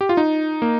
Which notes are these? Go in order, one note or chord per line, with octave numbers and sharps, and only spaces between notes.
G4
F4
D#4
A#3